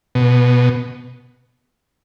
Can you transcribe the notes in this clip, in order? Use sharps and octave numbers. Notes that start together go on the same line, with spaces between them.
B2